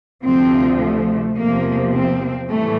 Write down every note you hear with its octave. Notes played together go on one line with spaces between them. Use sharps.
D2 C3 F3 C4
A3
E2 C3 F3 A#3
C4
A2 E3 G3 A3